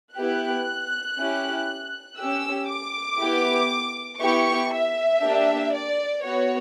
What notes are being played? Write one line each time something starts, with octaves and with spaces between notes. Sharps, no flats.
B3 E4 G4 F#6
C#4 E4 G4
C#4 G4 E6
D6
B3 E4 G4
B3 E4 G4 C#6
E5
A#3 D4 G4
D5
B3 F#4 C#5